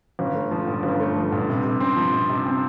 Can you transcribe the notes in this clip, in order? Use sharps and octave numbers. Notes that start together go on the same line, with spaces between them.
G1
A3
F3
G2
G1
A3
F3
G2
C3
C3
C4
F3
C3
C3
C4